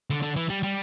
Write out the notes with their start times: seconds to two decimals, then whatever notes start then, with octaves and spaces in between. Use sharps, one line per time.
0.10 D3
0.22 D3
0.36 E3
0.49 G3
0.63 G3